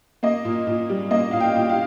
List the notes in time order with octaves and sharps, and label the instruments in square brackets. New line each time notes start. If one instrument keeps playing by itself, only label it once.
[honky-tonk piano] A#3 D#5
A#2
A#2
G3
A#3 D#5
A#2 F5
G5
A#2
F5